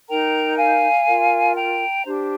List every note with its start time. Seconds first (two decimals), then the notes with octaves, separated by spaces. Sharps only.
0.08 D#4 A#4 G5 A#5
0.57 F5 G#5
1.06 F4 A#4
1.55 G5 A#5
2.05 D4 G4 C5